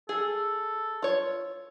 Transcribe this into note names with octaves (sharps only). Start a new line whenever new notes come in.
G#4 A4
F4 C#5